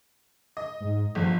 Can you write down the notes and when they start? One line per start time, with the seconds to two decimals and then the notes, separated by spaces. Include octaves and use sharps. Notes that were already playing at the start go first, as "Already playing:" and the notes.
0.57 D#5
0.80 G#2
1.15 G1 F3